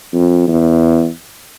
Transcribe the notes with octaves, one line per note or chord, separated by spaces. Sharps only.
F2
E2